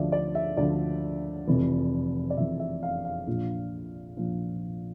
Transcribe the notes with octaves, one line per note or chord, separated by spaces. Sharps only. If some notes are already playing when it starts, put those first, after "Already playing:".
Already playing: D2 D3 F3 D5 E5
D5
E5
D2 D3 F3 D5
F1 F2 E3
D5
F1 F2 E3 E5
E5
F5
F5
A#1 A#2 F3
A#1 A#2 F3